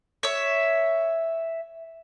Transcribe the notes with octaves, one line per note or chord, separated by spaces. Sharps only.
C#5 E5